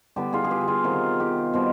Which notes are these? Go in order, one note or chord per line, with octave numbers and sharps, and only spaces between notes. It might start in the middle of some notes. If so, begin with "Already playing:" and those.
D3 G3 B3 G4
F4 G#4
G#4
G4 B4
G4
F4 G#4
C3 D#3 B3 F4
G4
B2 G3 C4